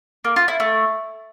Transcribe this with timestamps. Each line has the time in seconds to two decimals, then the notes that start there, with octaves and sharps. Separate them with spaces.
0.25 A#3
0.36 F4
0.48 E4
0.60 A3